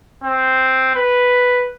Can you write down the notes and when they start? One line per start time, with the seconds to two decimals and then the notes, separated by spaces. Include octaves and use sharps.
0.24 C4
0.95 B4